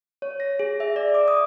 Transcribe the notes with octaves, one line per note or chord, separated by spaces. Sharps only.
C#5
A#6
G#4
E5
D5
D6
D#6